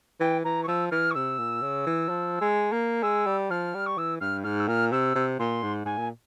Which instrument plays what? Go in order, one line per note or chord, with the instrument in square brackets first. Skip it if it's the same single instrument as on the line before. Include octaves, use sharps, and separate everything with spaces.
[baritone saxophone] E3 [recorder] G5
[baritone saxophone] E3 [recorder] A#5
[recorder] C#6
[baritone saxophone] F3 [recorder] E6
[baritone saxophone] E3 [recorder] F6
[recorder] C#6
[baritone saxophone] C3 [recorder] E6
[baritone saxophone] A#2
C#3
E3
F3
G#3
A#3
[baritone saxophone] G#3 [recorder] E6
[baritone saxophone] G3
[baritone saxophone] F3 [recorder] F6
[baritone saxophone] G3
[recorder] C#6
[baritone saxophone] E3 [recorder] E6
[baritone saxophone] G2 [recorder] F6
[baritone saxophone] G#2 [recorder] F6
[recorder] E6
[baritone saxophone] A#2 [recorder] F6
[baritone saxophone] C3 [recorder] E6
[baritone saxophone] C3
[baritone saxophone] A#2 [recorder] C6
[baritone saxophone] G#2
[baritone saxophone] G#2 [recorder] G#5
[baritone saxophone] A#2